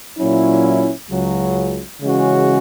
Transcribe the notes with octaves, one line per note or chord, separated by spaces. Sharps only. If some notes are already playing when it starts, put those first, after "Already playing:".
A#2 F#3 C#4 E4
C#2 C#3 F#3
C#3 E3 G#3 C#4 F#4